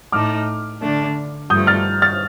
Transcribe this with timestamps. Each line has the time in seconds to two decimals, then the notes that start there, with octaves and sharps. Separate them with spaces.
0.12 A2 A3 D#4 D6 F6
0.82 D3 A3 D4
1.50 G2 F3 A3 D#6 G6
1.67 F6 A6
2.02 F6 A6